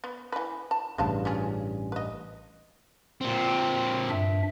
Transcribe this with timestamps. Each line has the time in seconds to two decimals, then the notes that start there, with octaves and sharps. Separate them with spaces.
0.04 B3
0.32 E3 B4
0.71 A5
0.98 A1 G2 C#3 B3 F5 A5
1.25 C#4 F4 G#4
1.92 B4 D#5
3.21 A#2 C4
4.10 G2 D4 E5